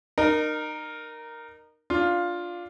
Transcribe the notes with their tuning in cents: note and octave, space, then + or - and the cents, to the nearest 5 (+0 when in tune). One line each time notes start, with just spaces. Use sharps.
D#4 -30 A#4 +0
D4 -5 F4 +5 F5 +0